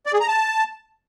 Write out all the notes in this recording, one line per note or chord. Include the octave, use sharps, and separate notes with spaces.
D5
G#4
A#5
A5